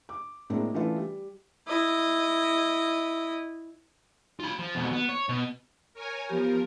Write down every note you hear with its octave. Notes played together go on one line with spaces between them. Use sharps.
D6
A2 G#3 A#3 C4 D4
C#3 E3 A3 D4 F4 B4
G3
E4 D#5
F4 B5
F3
F2 B2
B3
C#5
B2
A#4 C#5 G#5
F3 B3 G4 A#4